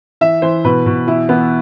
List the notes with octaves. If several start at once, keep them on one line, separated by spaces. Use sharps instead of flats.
E3 E5
E3 C5
B2 B4
B2
E3 E4
E3 B3